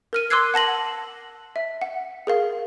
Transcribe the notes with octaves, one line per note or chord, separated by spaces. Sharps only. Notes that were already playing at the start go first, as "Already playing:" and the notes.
A#4 F6 D#7
C6 D6 E6 F#6 G#6 C7
F#5 A5 A#6 F#7
E5
F#5
G#4 A#4 F5